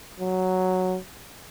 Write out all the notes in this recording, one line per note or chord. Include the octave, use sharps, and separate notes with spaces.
F#3